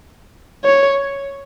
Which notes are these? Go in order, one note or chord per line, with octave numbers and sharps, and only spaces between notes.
C#5